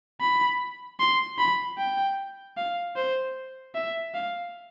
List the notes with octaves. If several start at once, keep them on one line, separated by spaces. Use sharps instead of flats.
B5
C6
B5
G5
F5
C5
E5
F5